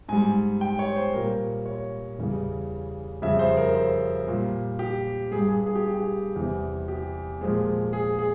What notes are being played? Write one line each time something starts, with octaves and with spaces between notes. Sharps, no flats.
G#2 G3 G#5
G5
C#5
C5
A#2 G3 A#4
C#5
E2 C#3 G3
F2 C#3 G3 E5
C5
A#4
C5
A#2 G3
G4
G2 G3 G#4
G#4
G#4
G4
G4
E2 C3 G3
G4
A#2 F3 G#3
G#4
G#4